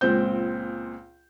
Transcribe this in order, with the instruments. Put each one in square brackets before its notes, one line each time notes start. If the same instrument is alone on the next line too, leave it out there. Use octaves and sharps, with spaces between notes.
[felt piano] C#2 A#2 C4 G6